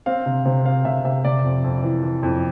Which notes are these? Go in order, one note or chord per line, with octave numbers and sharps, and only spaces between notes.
C4 F5
C3
C3
C4 F5
C3 E5
C3 E5
C3 D5
F2
F2
E3
E3
F2